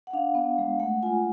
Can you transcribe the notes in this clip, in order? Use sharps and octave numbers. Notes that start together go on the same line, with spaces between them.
F#5
D4 F5
B3
G#3
A3 F#5
F4 G#5